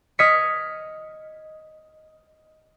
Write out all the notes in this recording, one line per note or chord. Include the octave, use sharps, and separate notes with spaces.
D#5 D#6 F6 G#6 B6 C#7